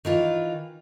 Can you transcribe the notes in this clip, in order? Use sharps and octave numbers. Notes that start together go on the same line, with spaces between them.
D#3 E3 F4